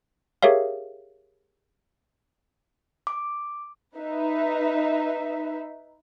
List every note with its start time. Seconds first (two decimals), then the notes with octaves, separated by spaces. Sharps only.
0.43 G4 G#4 A#4 C#5 E5 F5
3.07 D6
3.96 D#4 B4 E5